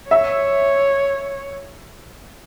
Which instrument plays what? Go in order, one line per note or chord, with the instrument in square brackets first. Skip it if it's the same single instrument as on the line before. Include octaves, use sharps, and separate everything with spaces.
[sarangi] C#5 [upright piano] E5